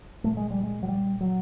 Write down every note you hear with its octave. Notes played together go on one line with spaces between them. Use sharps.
A#2 A3
G#3
G3
G#3
F#3
G3
F#3